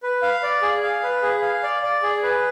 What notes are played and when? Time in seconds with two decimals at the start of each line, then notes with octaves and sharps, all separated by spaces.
0.03 B4
0.22 F5
0.43 D5
0.62 G#4
0.83 F5
1.03 B4
1.22 G#4
1.42 F5
1.63 D5
1.83 D5
2.03 G#4
2.23 B4